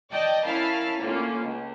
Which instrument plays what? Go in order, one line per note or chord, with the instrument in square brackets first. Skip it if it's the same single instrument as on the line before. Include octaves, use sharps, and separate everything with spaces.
[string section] D5 D#5 G5 A5
C#4 E4 A#4 F5 A5 B5
A2 D3 A#3 C#4 F4
C#2